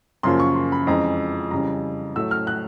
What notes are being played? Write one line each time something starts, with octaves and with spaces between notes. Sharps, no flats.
F#2 C#3 F3 A#3 C6
C#6
C6
B5
F2 C#3 E3 G#3 A#5
F2 C#3 E3 G3 A#5
A2 F#3 A3 E6
F6
F#6